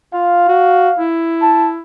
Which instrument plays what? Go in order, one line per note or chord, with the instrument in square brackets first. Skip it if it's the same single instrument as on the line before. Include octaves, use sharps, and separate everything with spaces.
[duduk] F4 [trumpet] F5
[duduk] F#4
E4
[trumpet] A5